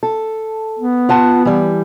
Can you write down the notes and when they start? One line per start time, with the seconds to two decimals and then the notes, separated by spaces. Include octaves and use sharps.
0.03 A4
0.79 B3
1.09 F4 F#5 A5
1.45 E3 G3